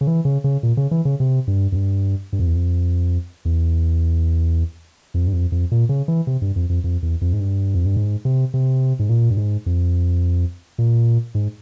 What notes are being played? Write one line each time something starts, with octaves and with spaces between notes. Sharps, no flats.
C#3
E3
C#3
C#3
A#2
C#3
E3
C#3
C3
G2
F2
G2
G2
F2
E2
F2
E2
F2
G2
F2
F2
A#2
C#3
E3
C3
G2
F2
F2
F2
E2
F2
G#2
G2
F2
G2
G#2
C3
C3
G#2
A#2
G2
G#2
F2
A#2
G#2